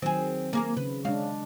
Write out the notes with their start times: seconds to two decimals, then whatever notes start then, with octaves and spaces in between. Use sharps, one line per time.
0.02 D#3 F#3 C4 G#4
0.53 A#3 G#4 A#4
0.77 C#3 B4
1.05 C#3 G#3 D4 F5